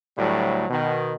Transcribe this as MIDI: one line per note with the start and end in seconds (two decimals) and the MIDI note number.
0.18 0.66 38
0.18 0.66 45
0.18 0.66 54
0.18 0.66 55
0.70 1.13 47
0.70 1.13 51